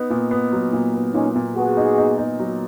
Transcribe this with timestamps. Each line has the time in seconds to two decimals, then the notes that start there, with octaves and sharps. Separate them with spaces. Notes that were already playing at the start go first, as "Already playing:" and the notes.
Already playing: B3 D#4
0.10 A#2
0.31 B3
0.53 F#3
0.73 A#2
0.94 B3
1.14 A#2 C#4 D#4
1.36 A#2
1.56 B3 F#4 G#4
1.77 D#4
1.98 D#4
2.18 D#4
2.40 F#3